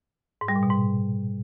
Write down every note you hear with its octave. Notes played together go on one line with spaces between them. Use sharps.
G#2
G3
A#2
B2
G#2